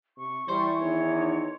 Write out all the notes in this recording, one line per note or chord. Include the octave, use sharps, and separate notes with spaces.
C3 C#6
E3 G3 C5
E2 D#3 D#4 C#5